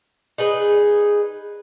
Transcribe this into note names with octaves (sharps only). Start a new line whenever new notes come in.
D#4 G#4 B4